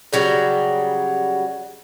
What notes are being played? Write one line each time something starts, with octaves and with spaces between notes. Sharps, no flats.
C#3 F#3 G3